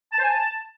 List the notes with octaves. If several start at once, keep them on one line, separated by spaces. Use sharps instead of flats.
A5
C5
G#5
A5